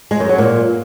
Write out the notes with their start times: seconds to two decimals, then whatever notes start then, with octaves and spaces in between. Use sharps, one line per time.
0.11 G#3
0.20 F#2
0.29 F#3
0.38 A#2